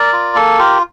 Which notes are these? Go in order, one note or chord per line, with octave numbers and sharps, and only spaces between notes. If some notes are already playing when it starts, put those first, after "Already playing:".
Already playing: A#4 D5
F4
A#3 A4
F4 G4 A#4